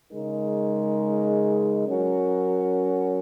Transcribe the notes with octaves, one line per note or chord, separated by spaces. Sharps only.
C#3 G#3 D#4 A#4
F#3 C#4 F#4 A#4